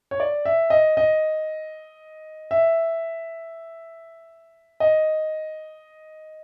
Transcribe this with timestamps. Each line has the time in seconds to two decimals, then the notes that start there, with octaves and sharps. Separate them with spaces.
0.11 C#5
0.20 D5
0.45 E5
0.70 D#5
0.97 D#5
2.51 E5
4.80 D#5